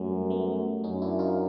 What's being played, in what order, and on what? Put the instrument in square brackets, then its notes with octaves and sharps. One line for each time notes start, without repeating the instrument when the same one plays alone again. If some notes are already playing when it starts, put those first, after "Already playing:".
Already playing: [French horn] F#2 [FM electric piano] G3 A3
[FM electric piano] A3 B3
[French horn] F#2 [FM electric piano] C#4 D#4
[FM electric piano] D4 E4
D#4 F4